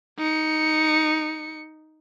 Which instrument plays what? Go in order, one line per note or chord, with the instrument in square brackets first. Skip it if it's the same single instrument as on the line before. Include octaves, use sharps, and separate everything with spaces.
[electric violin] D#4 C#7